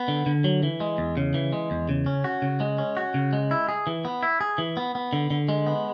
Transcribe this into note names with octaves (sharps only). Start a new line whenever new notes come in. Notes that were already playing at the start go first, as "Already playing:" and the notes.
Already playing: B3
D3
D3
F#3
E3
G#3
E2
C#3
E3
G#3
E2
C#3
C#4
F#4
C#3
G#3
C#4
F#4
C#3
G#3
E4
G#4
E3
B3
E4
G#4
E3
B3
B3
D3
D3
G#3
B3